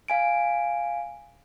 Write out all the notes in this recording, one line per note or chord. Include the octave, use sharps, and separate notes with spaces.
F5 G#5 D7